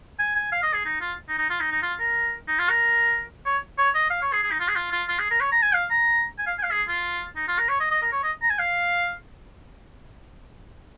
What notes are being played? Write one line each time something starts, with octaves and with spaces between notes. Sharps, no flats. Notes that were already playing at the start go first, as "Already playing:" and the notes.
G#5
G#5
F5
D#5
G#4
D#4
F4
D#4
D#4
F4
D#4
D#4
F4
A#4
D#4
F4
A#4
C#5
C#5
D#5
F5
C#5
G#4
G#4
D#4
F4
G#4
F4
F4
F4
G#4
A#4
C#5
A#5
G#5
F5
A#5
G#5
F5
G#5
F5
G#4
F4
D#4
F4
A#4
C#5
D#5
D#5
A#4
C#5
D#5
A#5
G#5
F5